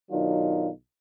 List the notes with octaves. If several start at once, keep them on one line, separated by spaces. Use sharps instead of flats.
B1 D#3 F#3 D4 D#4 F4